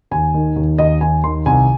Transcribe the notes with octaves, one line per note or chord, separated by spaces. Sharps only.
D#2 G#5
D#3
D#2
D#2 D#5
D#2 G#5
D#3 C6
C2 G#5